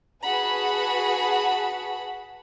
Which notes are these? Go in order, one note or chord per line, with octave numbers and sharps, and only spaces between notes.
F#4 G#4 B4 F#5 A5 B5